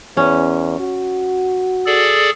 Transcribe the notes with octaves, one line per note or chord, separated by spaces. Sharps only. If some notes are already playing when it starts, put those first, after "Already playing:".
E2 C#4
F#4
G#4 A4 D5